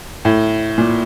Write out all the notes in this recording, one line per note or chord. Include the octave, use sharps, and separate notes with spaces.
A2
A#2